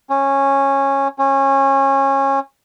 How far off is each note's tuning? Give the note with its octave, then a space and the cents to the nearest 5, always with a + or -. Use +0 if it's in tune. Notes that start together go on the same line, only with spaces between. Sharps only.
C#4 -15
C#4 -25